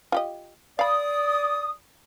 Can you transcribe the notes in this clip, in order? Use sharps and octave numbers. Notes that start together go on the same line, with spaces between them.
F4 G4 D#5
D5 F5 B5 D#6